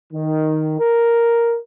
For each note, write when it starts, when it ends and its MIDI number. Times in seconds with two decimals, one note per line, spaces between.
0.13 0.76 51
0.79 1.58 70